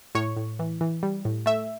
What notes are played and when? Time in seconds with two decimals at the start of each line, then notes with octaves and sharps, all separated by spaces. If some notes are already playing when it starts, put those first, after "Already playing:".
0.15 A2 C#5
0.37 A2
0.59 E3
0.81 E3
1.03 G3
1.25 A2
1.46 A3 E5